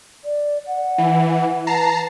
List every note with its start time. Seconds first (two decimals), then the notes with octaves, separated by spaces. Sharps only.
0.25 D5
0.67 F#5
0.98 E3
1.67 B4 A5 A#5 C7